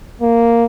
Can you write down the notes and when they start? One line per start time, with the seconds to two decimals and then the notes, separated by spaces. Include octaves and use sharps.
0.22 A#3